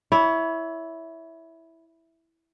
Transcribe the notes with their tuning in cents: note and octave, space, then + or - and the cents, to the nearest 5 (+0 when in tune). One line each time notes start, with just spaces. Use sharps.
E4 -5 C#5 +25